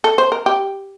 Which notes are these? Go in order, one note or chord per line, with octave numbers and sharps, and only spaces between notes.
A4
C5
A#4
G4